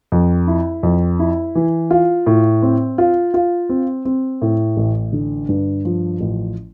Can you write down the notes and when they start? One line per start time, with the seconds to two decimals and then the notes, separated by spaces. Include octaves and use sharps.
0.12 F2
0.47 E4
0.83 F2
1.19 E4
1.55 E3
1.91 F4
2.26 A2
2.62 C4
2.98 F4
3.34 F4
3.70 C4
4.05 C4
4.42 A2
4.77 A1
5.13 D3
5.49 G2
5.85 F3
6.20 A1